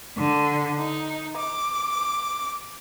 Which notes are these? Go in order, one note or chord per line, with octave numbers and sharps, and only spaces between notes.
D3
D#4
D6